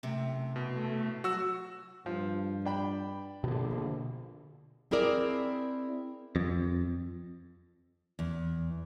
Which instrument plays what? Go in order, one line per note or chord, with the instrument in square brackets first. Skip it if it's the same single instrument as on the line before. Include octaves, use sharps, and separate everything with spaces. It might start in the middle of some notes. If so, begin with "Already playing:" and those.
[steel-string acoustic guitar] F#2 A2 C3
[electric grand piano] B2
[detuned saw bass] A3
[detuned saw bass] F#3 [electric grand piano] F#4 E6
[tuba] G2 [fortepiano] F3
[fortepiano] D4 G5 B5
[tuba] A#1 [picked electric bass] B2 D3
[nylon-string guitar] C4 E4 G#4 A#4 D5
[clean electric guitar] F2
[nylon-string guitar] E2